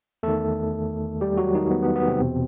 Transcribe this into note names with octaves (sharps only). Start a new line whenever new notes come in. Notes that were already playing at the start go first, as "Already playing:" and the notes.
E2 D#3 A3 A4
G3 G4
F#3 F#4
D#3 D#4
B3
B3
B3
C3 C4
E2 B2